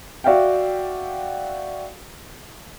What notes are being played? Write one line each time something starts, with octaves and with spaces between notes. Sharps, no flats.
F#4 D5 E5 F5 G5